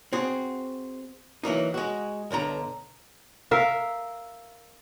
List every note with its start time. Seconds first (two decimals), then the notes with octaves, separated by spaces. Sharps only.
0.13 C4 F#4 G#4
1.43 E3 F#3 A#3 D#4
1.74 G#3 F#4
2.31 B1 G2 D3 A#5
3.51 A#4 E5 F5